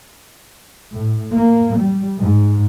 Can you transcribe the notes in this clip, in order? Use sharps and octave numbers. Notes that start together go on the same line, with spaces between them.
A2
A#3
G3
G#2